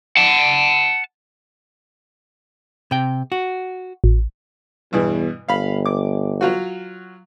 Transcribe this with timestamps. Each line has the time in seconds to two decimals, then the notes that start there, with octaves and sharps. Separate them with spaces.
0.17 F#5 A5
2.91 C3 G5
3.32 F#4
4.04 A1
4.93 E2 G2 B2 E3
5.48 G1 F5 B5
5.86 D6
6.41 F#3 F4 F#4